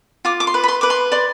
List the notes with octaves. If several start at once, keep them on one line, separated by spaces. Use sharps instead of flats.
F4 D6
D6
C6
B4
B5
C6
B4 D6
C6
D5 C6